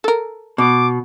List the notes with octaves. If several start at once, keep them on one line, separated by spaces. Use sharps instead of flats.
A4 A#4
B2 D6